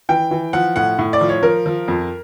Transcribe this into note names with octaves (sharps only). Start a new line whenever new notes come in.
E3 G5
E3
F3 F#5
A2 F#5
A2
D5
F3
C#5
F3 A#4
F3
F2